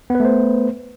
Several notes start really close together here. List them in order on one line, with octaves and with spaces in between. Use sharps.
B3 B4 A3 C5